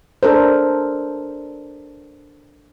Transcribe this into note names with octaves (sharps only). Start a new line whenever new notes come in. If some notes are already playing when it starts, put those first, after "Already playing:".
D4 A4 A#4 C5